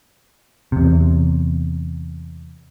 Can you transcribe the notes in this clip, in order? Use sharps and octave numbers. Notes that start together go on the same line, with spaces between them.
E2 C3